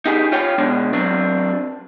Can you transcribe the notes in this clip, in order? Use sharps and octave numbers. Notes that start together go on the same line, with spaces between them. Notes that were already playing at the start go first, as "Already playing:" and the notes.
D#4 G4 G#4
F4 C#5 G5
B2 G#3 D4
F#3 C4 D4